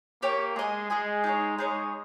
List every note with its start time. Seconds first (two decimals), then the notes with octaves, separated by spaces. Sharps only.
0.22 A#3 G4 C#5 G5
0.56 G#3 G#4 D#5 G#5
0.90 G#3 G#4 D#5 G#5
1.24 D#4 G#4 C#5
1.58 G#3 D#4 G#4 C#5